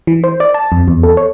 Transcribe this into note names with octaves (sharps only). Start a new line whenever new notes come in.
E3
C5
D5
A5
F2
E2
A4
C#5